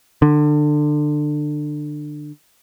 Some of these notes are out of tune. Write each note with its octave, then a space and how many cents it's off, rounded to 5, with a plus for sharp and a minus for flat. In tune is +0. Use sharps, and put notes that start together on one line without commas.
D3 +25